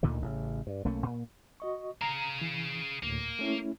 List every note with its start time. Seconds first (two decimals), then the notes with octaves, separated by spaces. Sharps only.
0.03 D2 A#2 D3 D#3
0.22 A1 C#3
0.67 G2
0.85 B1 A3 A#3 C#4
1.06 A#2
1.60 F#4 D#5 C#6
2.01 G#4 F5 A#5
2.41 E3
3.03 D2 A2 A#3
3.39 A3 C#4 E4